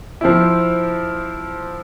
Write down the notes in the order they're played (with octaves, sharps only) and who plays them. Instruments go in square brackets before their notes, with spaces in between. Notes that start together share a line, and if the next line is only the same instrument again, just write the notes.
[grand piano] F3 C4 E4